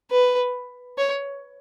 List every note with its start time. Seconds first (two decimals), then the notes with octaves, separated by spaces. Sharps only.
0.11 B4
0.98 C#5